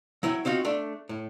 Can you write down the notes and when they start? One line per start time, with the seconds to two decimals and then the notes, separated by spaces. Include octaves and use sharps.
0.23 F#3 E4 C#5 G5
0.45 C4 D#4 F4 F#4
0.65 A3 D4
1.09 A2